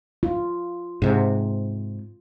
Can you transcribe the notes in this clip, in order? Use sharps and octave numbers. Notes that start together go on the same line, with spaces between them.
F4
G#2 C3